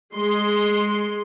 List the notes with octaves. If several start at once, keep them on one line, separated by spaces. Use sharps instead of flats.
G#3 C6